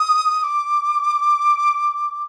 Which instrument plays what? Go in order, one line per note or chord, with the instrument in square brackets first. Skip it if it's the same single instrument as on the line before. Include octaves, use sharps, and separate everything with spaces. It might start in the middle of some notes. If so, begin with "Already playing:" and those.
Already playing: [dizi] D#6
D6